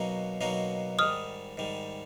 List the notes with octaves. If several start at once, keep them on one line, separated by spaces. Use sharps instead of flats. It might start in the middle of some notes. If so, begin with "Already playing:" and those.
Already playing: B2 F#3 A#3 D#4 F#4
B2 F#3 A#3 D#4 F#4
G#2 D#3 G3 D#6 F6
G#2 D#3 G3